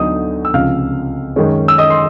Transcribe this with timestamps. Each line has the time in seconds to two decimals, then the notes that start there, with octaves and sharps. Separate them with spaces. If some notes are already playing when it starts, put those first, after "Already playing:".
Already playing: D2 D3 F#3 B3 D#4 D#5 D#6
0.45 E6
0.54 C#2 C3 F3 F5 F6
1.36 F#2 D#3 G#3 C#4
1.68 E6
1.78 D#5 D#6
1.90 C6